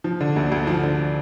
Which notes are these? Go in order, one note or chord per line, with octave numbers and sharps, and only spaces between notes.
F3
D3
D2
D2
F3
D3